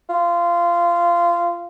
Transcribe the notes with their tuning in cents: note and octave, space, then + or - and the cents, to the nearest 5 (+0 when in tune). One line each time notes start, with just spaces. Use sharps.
F4 -15